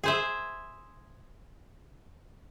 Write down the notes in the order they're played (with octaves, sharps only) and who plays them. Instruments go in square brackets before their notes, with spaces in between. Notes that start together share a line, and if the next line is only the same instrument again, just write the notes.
[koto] G#4 C5 E5